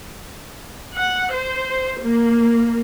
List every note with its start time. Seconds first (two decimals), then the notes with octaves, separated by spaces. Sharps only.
0.95 F#5
1.33 C5
2.00 A#3